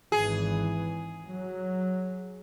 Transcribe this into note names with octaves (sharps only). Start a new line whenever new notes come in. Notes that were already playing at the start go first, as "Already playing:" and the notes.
G#1 E3 G#4
F#3